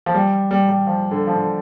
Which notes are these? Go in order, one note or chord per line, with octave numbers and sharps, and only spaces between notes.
F3
G3
G3
G3
F3
D3
F3
D3